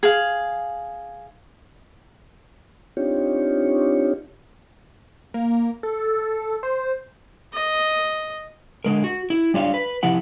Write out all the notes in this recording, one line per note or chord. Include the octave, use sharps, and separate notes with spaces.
G#4 F5
C4 D4 D#4 F4 G4 C#5
A#3
A4
C5
D#5
D3 G#3 A#4
F#4
E4
G3 D4 F4 C#5 F5
B4
C3 F3 E4 F#5